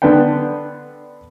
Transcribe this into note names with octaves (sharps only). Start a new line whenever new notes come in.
D3 B3 D4 B4 G5